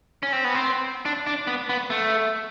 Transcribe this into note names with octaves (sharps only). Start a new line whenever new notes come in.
C#4
C4
B3
C4
D4
D4
B3
B3
A3